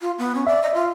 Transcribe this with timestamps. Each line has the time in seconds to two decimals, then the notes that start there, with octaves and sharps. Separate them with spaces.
0.01 F4
0.18 B3
0.35 C#4
0.47 D5 E5
0.63 D#5
0.74 F4